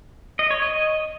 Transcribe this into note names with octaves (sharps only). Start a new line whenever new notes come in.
D#5
C#5
D#5